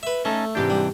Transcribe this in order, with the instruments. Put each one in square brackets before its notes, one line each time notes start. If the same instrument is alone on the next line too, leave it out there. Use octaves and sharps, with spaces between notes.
[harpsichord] B4 E5
[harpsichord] A3 [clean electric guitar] C#4 D#4 A4
[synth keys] G#2 G4 G6 [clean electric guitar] C3 E3 D4
[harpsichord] G3